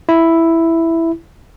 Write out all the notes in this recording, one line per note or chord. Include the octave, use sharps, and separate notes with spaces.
E4